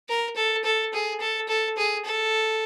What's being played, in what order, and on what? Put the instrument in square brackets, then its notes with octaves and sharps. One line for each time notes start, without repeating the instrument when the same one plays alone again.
[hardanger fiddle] A#4
A4
A4
G#4
A4
A4
G#4
A4